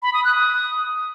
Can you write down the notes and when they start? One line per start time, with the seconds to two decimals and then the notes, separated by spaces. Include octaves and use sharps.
0.03 B5
0.14 D#6
0.24 F#6
0.35 D#6